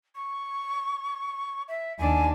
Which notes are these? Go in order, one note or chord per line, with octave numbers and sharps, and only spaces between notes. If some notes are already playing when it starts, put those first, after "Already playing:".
C#6
E5
D#2 D4 G#5